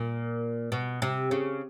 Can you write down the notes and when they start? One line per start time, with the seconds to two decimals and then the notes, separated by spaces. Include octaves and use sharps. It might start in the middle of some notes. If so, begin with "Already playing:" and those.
Already playing: A#2
0.72 B2
1.02 C3
1.31 C#3